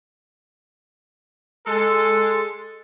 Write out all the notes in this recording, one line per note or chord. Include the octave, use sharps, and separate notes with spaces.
G#3 A4